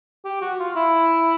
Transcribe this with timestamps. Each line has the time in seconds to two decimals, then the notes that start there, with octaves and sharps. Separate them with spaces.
0.24 G4
0.41 F#4
0.60 F4
0.76 E4